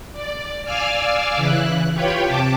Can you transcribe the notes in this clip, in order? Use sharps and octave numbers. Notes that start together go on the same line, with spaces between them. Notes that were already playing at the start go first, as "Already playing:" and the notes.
D5
D5 F5 G#5 D6 E6 F6
C#3 E3 E4 F#6
F4 G4 B4 C#5 G5 B5
C3 A5 D6